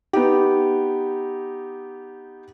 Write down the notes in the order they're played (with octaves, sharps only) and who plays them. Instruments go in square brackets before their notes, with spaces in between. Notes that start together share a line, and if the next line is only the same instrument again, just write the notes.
[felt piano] B3 D#4 G4